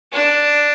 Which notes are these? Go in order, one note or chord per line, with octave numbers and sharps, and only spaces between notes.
D4